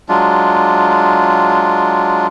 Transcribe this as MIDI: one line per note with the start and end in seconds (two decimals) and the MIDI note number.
0.09 2.27 54
0.09 2.27 56
0.09 2.27 62
0.09 2.27 65